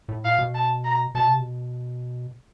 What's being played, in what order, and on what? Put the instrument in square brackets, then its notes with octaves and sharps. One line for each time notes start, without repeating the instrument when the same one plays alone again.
[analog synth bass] A2
[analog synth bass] A#2 [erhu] F5
[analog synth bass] B2
[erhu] A5
A#5
[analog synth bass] B2 [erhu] A5
[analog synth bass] C3
B2